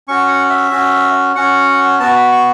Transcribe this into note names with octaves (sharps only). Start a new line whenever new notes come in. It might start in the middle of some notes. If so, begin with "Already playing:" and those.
C#4 F#4 C#6
F#5
E5
C#4 F#4
C#4 F#4 F#5
B3 F#4 A5
B5
C#6